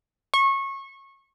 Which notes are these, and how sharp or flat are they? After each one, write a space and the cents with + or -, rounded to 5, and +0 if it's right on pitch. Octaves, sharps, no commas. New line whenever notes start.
C#6 -25